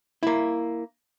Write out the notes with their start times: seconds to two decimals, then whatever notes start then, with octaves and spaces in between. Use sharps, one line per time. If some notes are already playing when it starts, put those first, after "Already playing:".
0.23 A#3 E4